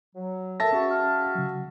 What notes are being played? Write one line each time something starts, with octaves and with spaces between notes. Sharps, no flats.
F#3
A4 A#4 E5 A5 A#6
C#4 F#4 G#4 C#6
F5
C#3 F#3